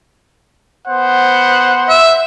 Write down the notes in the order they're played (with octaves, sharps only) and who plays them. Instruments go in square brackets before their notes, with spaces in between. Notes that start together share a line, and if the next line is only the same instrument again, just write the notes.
[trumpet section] B3 C5 F#5
[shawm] E5